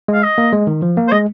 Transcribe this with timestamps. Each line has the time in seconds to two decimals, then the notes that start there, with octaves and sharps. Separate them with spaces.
0.08 G#3
0.14 F5
0.23 D#5
0.38 A#3
0.53 G#3
0.67 D#3
0.82 F3
0.97 A#3
1.08 C5
1.12 G#3 D#5